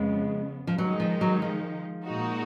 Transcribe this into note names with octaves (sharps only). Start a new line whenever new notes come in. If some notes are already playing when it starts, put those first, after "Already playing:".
Already playing: F2 C#3 F3 G#3 B3
F3
D#3 F#3 G#3 D#4
F3
F#3
F3
A#2 G#3 D#4 F#4